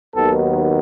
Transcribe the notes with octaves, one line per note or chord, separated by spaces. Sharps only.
D#2 D#3 F#3 B3 A4